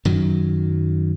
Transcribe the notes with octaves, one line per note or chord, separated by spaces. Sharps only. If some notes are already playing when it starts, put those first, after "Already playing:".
F#2 D#3 F#3